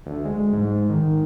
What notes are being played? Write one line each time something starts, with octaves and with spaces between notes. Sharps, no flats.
D2
G#3
G#2
D#3